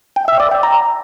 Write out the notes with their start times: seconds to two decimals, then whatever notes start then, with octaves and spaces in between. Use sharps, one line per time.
0.16 G5
0.28 E5
0.40 D5
0.51 G5
0.63 A#5